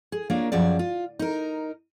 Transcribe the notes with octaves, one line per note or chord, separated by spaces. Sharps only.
G#4
A#3 D4 F4 A#4 C#5
F#2 F3 G#4 D5
F4
D#4 A#4